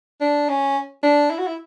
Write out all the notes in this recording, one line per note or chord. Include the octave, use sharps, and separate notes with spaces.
D4
C#4
D4
E4
F#4
E4